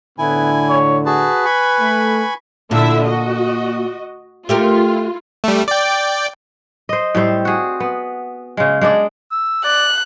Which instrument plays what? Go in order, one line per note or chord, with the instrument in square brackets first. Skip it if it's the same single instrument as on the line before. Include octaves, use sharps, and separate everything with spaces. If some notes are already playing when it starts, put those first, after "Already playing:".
[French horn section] A2 D3 [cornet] B3 [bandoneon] E4 G#5
[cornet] C#5
[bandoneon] F#4 G#4 A5 [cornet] B4
[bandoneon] G#5 B5 C#6
[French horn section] A3
[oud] A#2 [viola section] D3 E4 E5
[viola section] F#4 D#5
[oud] A3 G4 A#4 [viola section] F4
[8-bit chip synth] G3 A3
D5 G5
[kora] C5 D#5
A2 G3 C4 C5
F#4 G#4
B3
C#3 G#3
G#3 D4 G#4 D5
[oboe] E6
[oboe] D5 [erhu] F#6